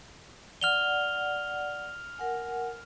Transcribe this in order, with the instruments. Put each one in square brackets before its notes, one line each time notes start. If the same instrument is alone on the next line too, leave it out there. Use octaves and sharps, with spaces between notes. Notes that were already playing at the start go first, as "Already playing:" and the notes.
[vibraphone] D5 F#5 [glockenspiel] F6 F7 G7
[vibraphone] A#4 F#5 G#5